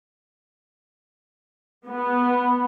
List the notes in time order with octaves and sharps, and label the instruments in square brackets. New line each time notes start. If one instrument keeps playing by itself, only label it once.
[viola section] B3